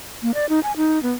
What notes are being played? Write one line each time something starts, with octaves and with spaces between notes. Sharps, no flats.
A#3
D5
D#4
G#5
D#4
B3